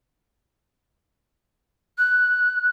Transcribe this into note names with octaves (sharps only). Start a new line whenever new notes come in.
F#6